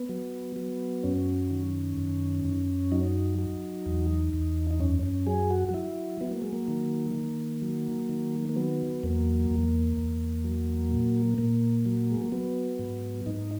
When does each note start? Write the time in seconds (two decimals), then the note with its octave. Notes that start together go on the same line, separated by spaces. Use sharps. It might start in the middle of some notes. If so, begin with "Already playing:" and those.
Already playing: B3
0.09 F#3
0.56 F#3
1.04 F#2 C#4
1.51 D#3
1.98 F#2
2.45 F#2
2.92 F#3 D#4
3.39 F#3
3.86 E2
4.33 E2
4.71 D#4
4.80 F#2 C#4
5.03 C#4
5.27 F#3 G#4
5.50 F#4
5.69 F#4
5.74 F#3 E4
6.21 F#3 B3
6.32 A#3
6.42 G#3
6.53 A#3
6.68 D#3
7.15 D#3
7.62 F#3
8.09 D#3
8.49 A#3
8.56 F#3 B3
9.03 E2 A#3
9.50 E2
9.97 E2
10.45 F#3
10.91 A#2
11.38 A#2 A#3
11.85 F#3
12.11 G#3
12.21 A#3
12.32 F#3 B3
12.79 G#2
13.26 G#2 D#4